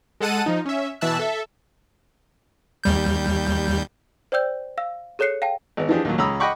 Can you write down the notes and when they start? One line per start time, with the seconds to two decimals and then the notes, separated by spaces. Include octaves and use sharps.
0.21 G#3 A4 F#5 A5 D#7
0.46 F3 D#4
0.65 C#4 E5
1.01 B2 E3 E5 A5 E6 F#6
1.19 A4 E5
2.84 D#2 G3 G6
4.32 C5 D5 G5 E6 G6
4.78 F5 E6
5.19 G#4 A4 C#5 F#6 C7 C#7
5.42 F5 G5 A5
5.77 G#1 B3
5.89 E3 F3 D4 G4 G#4
6.05 D#2 A#2 F#3
6.18 C#2 C#4 A#5 B5 D#6 E6
6.40 D#5 F#5 G5 B5 C#6 D6